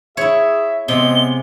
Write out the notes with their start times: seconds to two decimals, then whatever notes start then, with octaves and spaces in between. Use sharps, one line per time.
0.17 E4 G#4 C#5 E5
0.88 C3 G#3 B3 D#5 G7